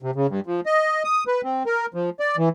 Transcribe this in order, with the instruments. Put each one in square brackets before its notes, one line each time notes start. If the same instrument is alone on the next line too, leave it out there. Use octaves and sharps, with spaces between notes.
[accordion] C3
C#3
G2
F3
D#5
D#6
B4
C4
A#4
F3
D5
E3